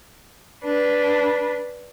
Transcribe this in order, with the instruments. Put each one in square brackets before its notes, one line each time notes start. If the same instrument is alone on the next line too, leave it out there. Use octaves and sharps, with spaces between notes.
[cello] D4 B4